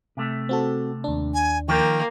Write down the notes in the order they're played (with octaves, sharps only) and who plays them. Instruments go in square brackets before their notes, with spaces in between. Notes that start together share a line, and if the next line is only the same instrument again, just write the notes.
[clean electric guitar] C3 A3
[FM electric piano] C4 F#4 A4
D#2 D4
[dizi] G#5
[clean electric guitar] D#3 F3 [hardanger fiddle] A#3 [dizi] G5